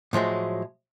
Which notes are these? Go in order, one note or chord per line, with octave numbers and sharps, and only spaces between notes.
A2 F3 F#3 G#3